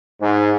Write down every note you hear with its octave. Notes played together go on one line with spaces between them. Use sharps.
G#2